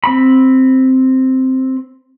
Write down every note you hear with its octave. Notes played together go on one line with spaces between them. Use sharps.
C4 B5